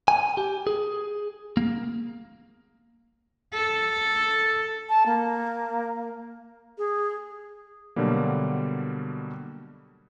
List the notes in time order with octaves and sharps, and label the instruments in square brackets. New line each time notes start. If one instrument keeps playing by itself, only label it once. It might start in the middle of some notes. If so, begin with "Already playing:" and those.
[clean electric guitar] G#5
G4
G#4
A#3
[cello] A4
[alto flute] A5
A#3
G#4
[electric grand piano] B2 D3 F#3 G3 A#3